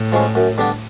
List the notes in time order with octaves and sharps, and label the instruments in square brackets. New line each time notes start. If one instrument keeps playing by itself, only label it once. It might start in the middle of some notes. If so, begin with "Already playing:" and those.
Already playing: [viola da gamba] A2
[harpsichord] F3 G#3 C#4
F#2
D3 G3 B3 D4